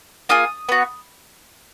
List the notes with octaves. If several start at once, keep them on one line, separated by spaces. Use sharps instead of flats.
A#3 F4 G#4 D#6
B3 F#4